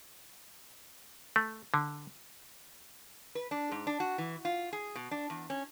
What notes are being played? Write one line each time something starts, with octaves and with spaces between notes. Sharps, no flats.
A3
D3
B4
D4
G#2
D4
F#4
E3
F4
G#4
B2
D4
E2
C#4